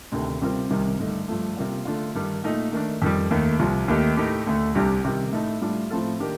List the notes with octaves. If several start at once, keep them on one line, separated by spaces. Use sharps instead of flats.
D2 C3 D#3 A3 D4
C3 G3 C4 F4 A#4
C2 C3 D#3 G3
G2 D3 A3 D#4
G2 F3 A3
C3 G3 A#3 F4
D3 A3 D4 F4
G2 D#3 G3
A#2 A3 D#4
D#3 A3 D4
F2 D#3 G3
D#2 D#3 A3
C2 C3 F3
D#2 D#3 A3 D#4 G4
A2 A3 D#4 G4 A#4
D2 D3 A3
C2 C3 G3 D4 G4
C3 D#3 G3
A2 A3 D#4 A4
A2 G3 D4 F4
A2 F3 C4 F4 A4
D#3 A#3 D4 G4 A#4